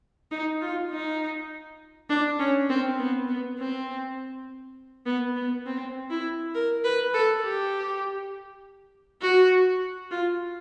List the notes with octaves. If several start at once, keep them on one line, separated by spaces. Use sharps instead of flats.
D#4
F4
D#4
D4
C#4
C4
B3
B3
C4
B3
B3
C4
E4
A#4
B4
A4
G4
F#4
F4